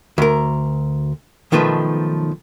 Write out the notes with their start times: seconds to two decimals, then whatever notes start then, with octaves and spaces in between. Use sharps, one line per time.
0.18 D2 A#4
1.52 B1 D#3 F3 A3 B4